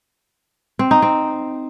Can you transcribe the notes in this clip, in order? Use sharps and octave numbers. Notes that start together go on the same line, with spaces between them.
C4
D#4
C4